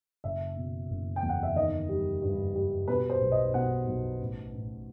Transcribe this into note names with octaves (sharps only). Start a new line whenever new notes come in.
F#1 E5
B2
F#1
G5
E2
F#5
E5
D#3 D#5
G3
G2
G3
B2 B4
C5
B1
D#5
B2 F#5
B1
A1
A1